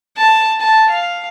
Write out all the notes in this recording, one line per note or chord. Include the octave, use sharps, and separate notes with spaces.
A5
A5
F5